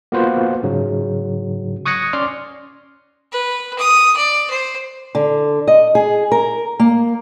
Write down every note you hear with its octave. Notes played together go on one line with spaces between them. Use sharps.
A#3 B3 F4 F#4 B4 C5
G#2 C#3 F#3
C#6 D#6 F#6 G#6 A#6 C#7
C#4 D5 C6 D6 F6
B4
D#6
D5
C5
D3
D#5
G#4
A#4
A#3